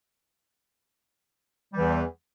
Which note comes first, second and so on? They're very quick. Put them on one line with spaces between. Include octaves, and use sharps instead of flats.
G3 E3 E2